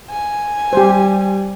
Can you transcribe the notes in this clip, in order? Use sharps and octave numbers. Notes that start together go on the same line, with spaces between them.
G#5
G3 G4 C5